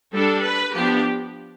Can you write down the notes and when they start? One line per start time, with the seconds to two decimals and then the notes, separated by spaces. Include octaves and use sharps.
0.13 G3 D4 A4
0.44 B4
0.74 F3 B3 D4 G4